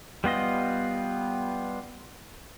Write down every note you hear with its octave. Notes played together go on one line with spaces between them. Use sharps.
G3 B3 F4 D#5